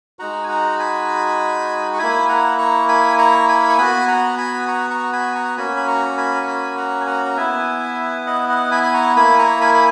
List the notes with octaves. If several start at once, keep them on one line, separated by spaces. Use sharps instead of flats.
G#3 D#4 F#4 F#5 A#5
G#5
F#5 A#5
G#5 B5
C#6
A#3 E4 G#5 B5
F#5 A#5
A#5 C#6
G#5 B5
A#5 C#6
G#5 B5
C#6
B3 F#4 G#5 B5
F#5 A#5
G#5 B5
A#5 C#6
A#5 C#6
G#5 B5
A#5 C#6
A#3 C#4 F#4 G#5 B5
B5
A#5 C#6
C#6
G#5 B5
C#6
G#5 B5
F#5 A#5
G#5
F#5 A#5
A#5
B3 E4 E5 G#5
D#5 F#5
D#5 F#5
G#5 B5
B5
A#5 C#6
A#3 E4 G#5 B5
A#5 C#6
G#5 B5
B5